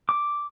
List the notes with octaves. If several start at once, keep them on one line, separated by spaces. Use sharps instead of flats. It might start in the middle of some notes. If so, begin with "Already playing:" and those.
D6